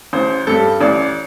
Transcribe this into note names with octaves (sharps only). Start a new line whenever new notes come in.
A1 C5
G2 G3 A4
A1 D5